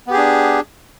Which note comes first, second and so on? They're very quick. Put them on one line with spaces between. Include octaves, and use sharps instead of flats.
B3 G4 G#4 D4